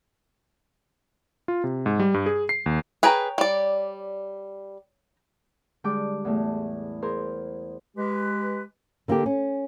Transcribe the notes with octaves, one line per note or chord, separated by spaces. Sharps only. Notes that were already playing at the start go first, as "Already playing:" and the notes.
F4
C3
G#2
G3
G2
G#4
C7
D#2
G#4 B4 C#5 G5 A#5
G3 D5
D3 G3 G#3 G5 D6 G6
E2 A2 A3
G#4 A#4 C5 C6
G#3 G4 B4
D3 A#3 D4 G4
C#4